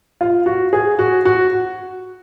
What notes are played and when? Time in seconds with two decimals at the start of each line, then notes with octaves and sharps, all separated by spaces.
0.21 F4
0.46 F#4
0.73 G#4
0.99 F#4
1.25 F#4